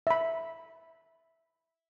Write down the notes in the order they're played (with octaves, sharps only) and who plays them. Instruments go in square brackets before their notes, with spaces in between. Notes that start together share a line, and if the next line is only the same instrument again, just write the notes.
[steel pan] E5 B5